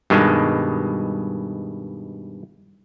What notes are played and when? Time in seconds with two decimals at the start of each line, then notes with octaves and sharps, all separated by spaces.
0.10 G2 B2 D#3 G#3